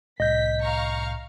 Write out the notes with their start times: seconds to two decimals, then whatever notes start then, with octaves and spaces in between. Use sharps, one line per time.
0.20 C2 A2 D#5 G6 B6
0.60 F5 A#5 C#6